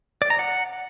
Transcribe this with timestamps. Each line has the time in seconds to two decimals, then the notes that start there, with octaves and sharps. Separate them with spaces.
0.22 D5
0.30 A#5
0.39 F#5